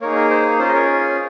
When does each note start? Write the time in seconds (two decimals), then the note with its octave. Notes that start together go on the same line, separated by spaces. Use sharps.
0.01 A#3 D#4 G#4 A#4 C#5
0.15 A#4
0.30 C5
0.59 C#4 F4 G#4 C5
0.68 D#5
0.74 A#4 C#5